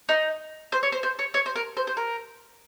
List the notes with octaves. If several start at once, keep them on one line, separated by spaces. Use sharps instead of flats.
D#4
C5
C#5
C5
C5
C#5
C#5
C5
A#4
C5
C5
A#4